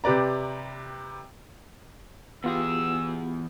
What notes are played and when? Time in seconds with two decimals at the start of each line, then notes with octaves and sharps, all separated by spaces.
0.04 C3 G4 B4 D5 A#5
2.44 E2 B3 F4 G4 G#4 E6